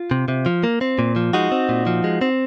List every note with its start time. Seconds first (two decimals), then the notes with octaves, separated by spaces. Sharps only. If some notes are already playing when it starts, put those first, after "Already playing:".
Already playing: F4
0.11 C3
0.28 C3
0.46 F3
0.63 A#3
0.81 C4
0.99 A#2
1.16 F3
1.33 G#3 D#4 F#4
1.52 C4
1.69 A#2
1.87 F3
2.04 G#3
2.21 C4